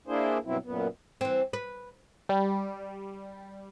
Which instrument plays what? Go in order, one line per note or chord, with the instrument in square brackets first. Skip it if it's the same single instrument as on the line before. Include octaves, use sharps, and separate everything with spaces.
[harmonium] A#3 D4 E4 G#4 C5
G2 B2 F#3 C4 E4
F#2 A#2 B3
[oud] E3 C4
B4
[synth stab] G3